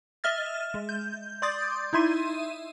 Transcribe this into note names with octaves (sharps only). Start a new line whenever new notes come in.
D#5 E5 F6 A6
G#3
G6
D5 C6 D6 D#6 G6 A6
D#4 E4 E5 C6 D#7